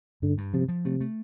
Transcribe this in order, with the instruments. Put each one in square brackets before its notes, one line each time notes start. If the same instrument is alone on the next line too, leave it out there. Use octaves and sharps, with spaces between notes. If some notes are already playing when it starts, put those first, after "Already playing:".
[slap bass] G2 [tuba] D3
[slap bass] G2
[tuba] C3 [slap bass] F3
[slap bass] F3
[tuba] C3 [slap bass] A3
[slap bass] A3